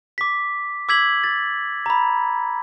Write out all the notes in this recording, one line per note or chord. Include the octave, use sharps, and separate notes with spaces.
D6 B6
D6 E6 G#6 B6 F#7
A6
A#5 B5